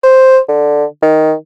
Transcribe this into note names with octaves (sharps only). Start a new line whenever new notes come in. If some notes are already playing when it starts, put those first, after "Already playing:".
C5
D3
D#3